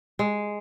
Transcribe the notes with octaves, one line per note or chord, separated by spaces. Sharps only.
G#3